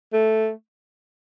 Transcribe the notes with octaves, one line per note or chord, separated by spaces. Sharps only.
A3